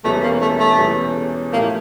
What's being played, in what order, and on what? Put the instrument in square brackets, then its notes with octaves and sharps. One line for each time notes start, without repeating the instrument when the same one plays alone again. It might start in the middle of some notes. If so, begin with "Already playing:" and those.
[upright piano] E1 E2 E3 G3 C#4 [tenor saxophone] A3
[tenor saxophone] A#3
A3
A3
[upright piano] E1 E2 E3 G3 C#4
[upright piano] A2 F3 A3 E4 G4 [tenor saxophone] A#3